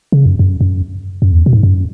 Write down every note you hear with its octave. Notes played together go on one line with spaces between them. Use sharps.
C#3
F#2
F#2
F#2
F#2
E2
B2
G#2
F#2